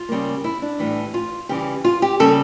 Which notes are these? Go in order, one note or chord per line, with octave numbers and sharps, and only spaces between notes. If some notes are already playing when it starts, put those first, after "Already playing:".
Already playing: F4
C#3 G3 A#3
E4
D4
A2 E3 G3
F4
C#3 E3 G3 G4
F4
G4
C#3 G3 A#3 A4